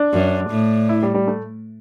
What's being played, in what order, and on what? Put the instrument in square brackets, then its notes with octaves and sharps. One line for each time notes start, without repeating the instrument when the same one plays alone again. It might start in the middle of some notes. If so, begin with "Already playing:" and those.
Already playing: [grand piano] D4
[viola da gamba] F#2
A2
[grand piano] E4
G3
G3
A3